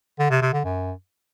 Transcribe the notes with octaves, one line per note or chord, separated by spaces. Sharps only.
D3
C3
C3
D3
F#2